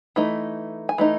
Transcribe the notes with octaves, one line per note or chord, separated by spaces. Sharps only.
E3 A3 D#4
G#5
E3 A3 D#4